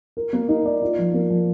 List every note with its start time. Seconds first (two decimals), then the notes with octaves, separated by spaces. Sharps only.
0.17 A#4
0.33 A#3
0.48 D#4
0.65 D5
0.82 F4
0.98 F3
1.14 A#3
1.30 F3